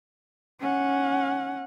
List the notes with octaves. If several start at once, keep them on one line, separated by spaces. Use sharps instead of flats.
C#4 F#5